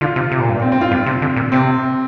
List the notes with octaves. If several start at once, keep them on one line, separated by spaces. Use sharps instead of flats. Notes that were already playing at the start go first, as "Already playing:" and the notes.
D3 F4
C3
C3
A#2
G2
A#2 C4
C4
F4
G2 C4
C3
D3
A#2
C3 C4